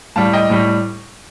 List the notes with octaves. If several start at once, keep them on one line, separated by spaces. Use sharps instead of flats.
A2 G3 F5 A5
D#5 G5
A2 G3